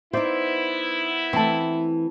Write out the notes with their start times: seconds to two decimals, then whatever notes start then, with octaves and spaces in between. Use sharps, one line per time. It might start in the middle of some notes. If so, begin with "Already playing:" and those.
0.13 B3 D#4 E4 C5 D5 E5
1.33 E3 A3 C4 A5